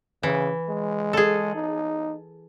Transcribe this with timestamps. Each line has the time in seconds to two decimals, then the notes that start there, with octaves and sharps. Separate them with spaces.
0.23 C#3 E3
0.69 G#3
1.13 G#4 A4
1.55 D#4